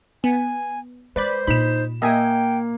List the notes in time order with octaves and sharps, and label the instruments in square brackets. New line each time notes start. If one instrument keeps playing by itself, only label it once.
[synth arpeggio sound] B3 [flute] G#5
[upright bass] G#3 [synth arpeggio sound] B4 D5 B5 [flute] C5
[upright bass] A#2 D4 [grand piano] D#4 E7 [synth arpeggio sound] B5
[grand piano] A#3 [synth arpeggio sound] D#5 E5 G#5 [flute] G5